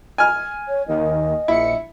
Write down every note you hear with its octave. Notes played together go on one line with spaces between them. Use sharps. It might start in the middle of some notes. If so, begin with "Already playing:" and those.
G#5 F6
C#5
D#2 D#3 D#5
A#1 E4 C#7